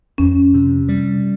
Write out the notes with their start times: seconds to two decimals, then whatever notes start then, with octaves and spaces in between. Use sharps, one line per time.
0.18 F2 C#4
0.54 C3
0.89 G3